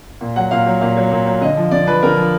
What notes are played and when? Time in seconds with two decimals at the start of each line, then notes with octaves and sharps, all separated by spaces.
0.21 A#2
0.36 F#3 F#5
0.51 A#2 F5
0.66 F#3
0.81 A#2 F5
0.97 F#3
1.11 A#2
1.26 F#3
1.41 D3 D#5
1.57 F3
1.71 D3 D5
1.87 F3 B4
2.02 D3 A#4
2.17 F3